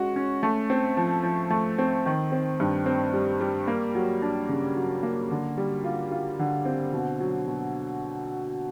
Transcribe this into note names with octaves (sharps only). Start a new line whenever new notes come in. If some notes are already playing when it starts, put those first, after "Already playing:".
Already playing: G#3 C#4 F#4
C#4
A3
C4
F3
F3
A3
C4
D#3
C4
G2
C4
G3
G3
A#3
F#3
D4
C#3
F#3
A#3
D3
G3
F4
F4
D3
C4
B2
F#3
B2